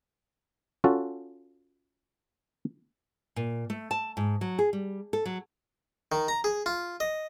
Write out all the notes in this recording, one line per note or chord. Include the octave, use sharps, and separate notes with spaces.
C#4 F4 F#4 A4
A#2
A3
A5
G#2
F#3
G#4
G3
A4
F#3
D#3
A#5
G#4
F4
D#5